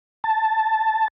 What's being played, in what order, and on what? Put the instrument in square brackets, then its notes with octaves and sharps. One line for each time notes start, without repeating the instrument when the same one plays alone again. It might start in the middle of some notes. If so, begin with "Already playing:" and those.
[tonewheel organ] A5